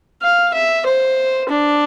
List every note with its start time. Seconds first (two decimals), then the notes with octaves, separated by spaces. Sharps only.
0.22 F5
0.54 E5
0.86 C5
1.49 D4